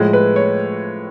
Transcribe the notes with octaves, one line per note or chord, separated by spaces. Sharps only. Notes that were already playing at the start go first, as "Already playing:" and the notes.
Already playing: A2 F3 G#3
B4
C#5